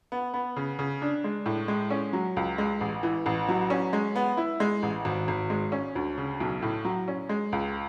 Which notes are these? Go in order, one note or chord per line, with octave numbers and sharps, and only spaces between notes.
B3
B3
C#3
C#3
D4
G#3
A2
G#3
C#4
F#3
C#2
G#3
A1
E3
A1
F#3
C#4
G#3
B3
E4
G#3
A1
G#1
G#1
G#3
C#4
D2
C#3
B1
A2
F#3
C#4
G#3
C#2